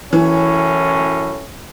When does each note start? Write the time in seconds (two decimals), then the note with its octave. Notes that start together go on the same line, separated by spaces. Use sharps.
0.13 F#2 A2 E3 C#4